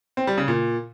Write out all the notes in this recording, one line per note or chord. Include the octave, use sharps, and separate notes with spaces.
C4
G3
C#3
A#2